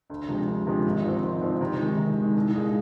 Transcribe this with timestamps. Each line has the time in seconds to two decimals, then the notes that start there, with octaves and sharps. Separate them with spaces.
0.10 D2
0.29 C3 F3 G#3
0.48 D2
0.67 C3 F3 G#3
0.86 G#1
1.04 G#2 F3 C4
1.23 G#1
1.41 G#2 F3 C4
1.61 C3
1.79 D#3 G#3
1.98 C3
2.16 D#3
2.22 G#3
2.36 C2
2.55 A#2 G#3 D#4 G#4